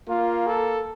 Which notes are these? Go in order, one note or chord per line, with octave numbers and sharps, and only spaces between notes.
A#3 F4
A4